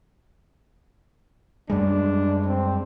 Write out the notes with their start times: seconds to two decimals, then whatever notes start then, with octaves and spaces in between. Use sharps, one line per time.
1.70 F#2 G3 G#3 D4
2.47 C4